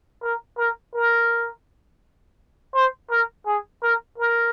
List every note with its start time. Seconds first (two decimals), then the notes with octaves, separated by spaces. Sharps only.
0.22 A#4
0.58 A#4
0.95 A#4
2.75 C5
3.11 A#4
3.46 G#4
3.83 A#4
4.18 A#4